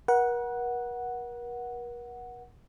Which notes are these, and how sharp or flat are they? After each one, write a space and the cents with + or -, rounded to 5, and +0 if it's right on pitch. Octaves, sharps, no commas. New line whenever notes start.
A#4 +45 F#5 +0